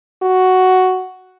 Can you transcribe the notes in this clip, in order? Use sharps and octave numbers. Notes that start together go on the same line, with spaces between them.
F#4